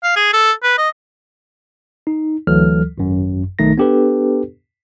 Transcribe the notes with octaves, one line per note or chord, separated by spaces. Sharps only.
F5
G#4
A4
B4
D#5
D#4
D2 E3 F#3 A4 F6
G#1 F#2
B1 D#3 A3 D#4 A#6
B3 D4 G4 A4 B4